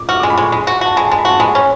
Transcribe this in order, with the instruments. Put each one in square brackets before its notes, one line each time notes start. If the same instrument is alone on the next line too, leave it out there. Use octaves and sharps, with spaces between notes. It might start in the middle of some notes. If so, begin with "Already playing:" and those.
Already playing: [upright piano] D6
[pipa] F#4 [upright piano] F6
[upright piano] D6
[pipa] G#3
[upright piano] B5
[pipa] G#3 [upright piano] C#6
[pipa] G#3 [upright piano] B5
[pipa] F#4
[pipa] F#4 [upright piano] A5
[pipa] G#3 [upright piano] B5
[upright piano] A5
[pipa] G#3
[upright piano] B5
[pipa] F#4 [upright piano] A5
[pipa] G#3 [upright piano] B5
[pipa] C#4